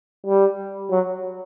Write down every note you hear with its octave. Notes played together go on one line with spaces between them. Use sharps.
G3
F#3